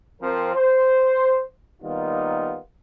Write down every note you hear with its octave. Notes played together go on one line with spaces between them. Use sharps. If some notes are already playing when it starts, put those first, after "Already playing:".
F3 C4 A#4
C5
D#3 G3 A#3 B3 D#4 F4